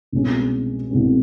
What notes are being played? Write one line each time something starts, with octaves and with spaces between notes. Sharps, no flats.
C2 B2 G#3 C#4
C2 B2 G#3 C#4